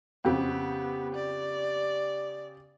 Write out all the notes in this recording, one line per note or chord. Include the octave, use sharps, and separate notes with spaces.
F2 C#3 B3 G4
D5